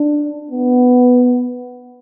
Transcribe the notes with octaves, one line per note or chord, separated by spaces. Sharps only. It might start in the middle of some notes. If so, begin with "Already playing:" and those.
Already playing: D4
B3